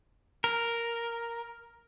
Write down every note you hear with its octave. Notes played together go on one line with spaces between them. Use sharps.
A#4